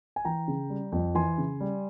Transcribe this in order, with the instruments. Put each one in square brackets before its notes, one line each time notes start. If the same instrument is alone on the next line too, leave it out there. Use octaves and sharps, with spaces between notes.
[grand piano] G#5
E3 G5 A#5
C#3
G3
F2
E3 G#5 C6
C#3
G3